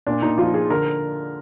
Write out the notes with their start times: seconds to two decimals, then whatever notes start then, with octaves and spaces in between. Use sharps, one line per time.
0.07 A#2 D4
0.22 A#2 D#4
0.38 F3 F4
0.54 F3 G#4
0.70 D3 A#4